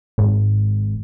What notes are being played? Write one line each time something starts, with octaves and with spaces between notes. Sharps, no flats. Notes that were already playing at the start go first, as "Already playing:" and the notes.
G#1